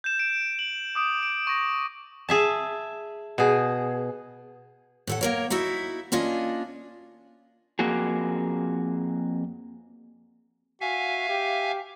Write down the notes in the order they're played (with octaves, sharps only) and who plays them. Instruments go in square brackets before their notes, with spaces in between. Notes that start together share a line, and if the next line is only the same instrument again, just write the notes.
[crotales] G6 E7
D7
F#7
D6 D#6 D7
D7
C#6 A#6
[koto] G#4 E5 A5
B2 G#4
[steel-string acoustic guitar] A2 A4 F#5
A#3 A#4 C#5
D#4 E4 F#4 E5
A#3 C#4 D4 F4 D#5
[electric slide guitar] F2 A#3 F#4 G#4
[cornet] F#4 [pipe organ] E5 F5 G#5
[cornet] G4